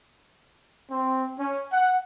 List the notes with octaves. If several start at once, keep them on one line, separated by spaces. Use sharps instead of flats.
C4
C#4
F#5